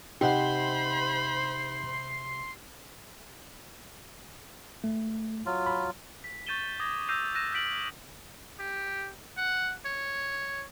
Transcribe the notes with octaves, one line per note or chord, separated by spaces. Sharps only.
C3 D#4 G4 C5 D#5 F#5 B5 C6
A3
F#3 F4
B5
B6
C#6 G6 A6 D#7 E7 G7
D6 D#6 G#6 A#6 B6
E6 G6 A#6 C7 D#7 F7
E6 F#6 A#6 D#7 E7
F6 G6 A#6 B6 D7 F#7
G4
F#5
C#5